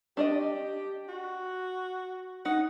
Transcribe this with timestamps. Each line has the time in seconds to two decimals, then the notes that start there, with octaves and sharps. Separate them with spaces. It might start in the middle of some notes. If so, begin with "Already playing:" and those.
0.17 D4 G4 D5 D#5
1.09 F#4
2.45 D#4 F#5